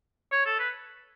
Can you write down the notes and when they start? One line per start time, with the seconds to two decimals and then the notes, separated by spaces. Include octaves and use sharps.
0.32 C#5
0.46 A4
0.59 B4